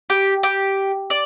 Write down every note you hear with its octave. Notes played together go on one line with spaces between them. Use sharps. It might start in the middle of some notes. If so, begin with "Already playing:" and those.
G4
G4
D5